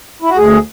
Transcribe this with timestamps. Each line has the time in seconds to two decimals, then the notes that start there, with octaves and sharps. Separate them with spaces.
0.22 E4
0.30 F#4
0.37 D2 G#4